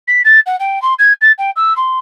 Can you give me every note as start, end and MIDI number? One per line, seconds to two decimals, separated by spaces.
0.07 0.21 95
0.24 0.39 93
0.46 0.56 78
0.59 0.81 79
0.82 0.93 84
0.99 1.13 92
1.21 1.31 93
1.38 1.50 79
1.56 1.73 88
1.76 1.98 84